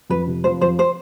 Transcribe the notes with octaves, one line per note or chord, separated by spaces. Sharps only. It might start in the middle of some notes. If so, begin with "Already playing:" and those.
F2 B4
C3
F3 C5
F2 C5
C5